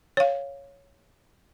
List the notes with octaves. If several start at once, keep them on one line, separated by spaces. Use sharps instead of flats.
C#5 F5